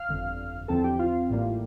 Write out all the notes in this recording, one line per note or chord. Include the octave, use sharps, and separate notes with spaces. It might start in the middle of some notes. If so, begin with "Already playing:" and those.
Already playing: F5 F6
G1 F2 D3
E2 D3 F3 C4 A4 A5
G4 G5
F4 F5
A1 A2 G3 A#3